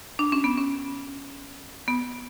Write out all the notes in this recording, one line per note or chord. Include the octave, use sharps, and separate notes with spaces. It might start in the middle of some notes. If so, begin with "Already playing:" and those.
D4
C#4
B3
C#4
B3